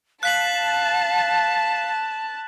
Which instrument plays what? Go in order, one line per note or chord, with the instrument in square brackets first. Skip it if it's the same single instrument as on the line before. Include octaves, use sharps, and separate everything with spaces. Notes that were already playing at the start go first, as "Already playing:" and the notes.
[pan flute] F5 [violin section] A5 [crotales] F#6 B6 F#7